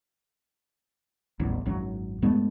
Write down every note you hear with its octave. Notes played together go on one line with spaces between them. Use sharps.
D#1 A1 E2
G#1 F#2 F#3
G2 G#3 A3 B3